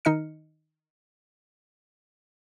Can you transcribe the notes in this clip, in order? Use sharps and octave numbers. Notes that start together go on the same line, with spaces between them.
D#3 D#4 D#5 F6 C#7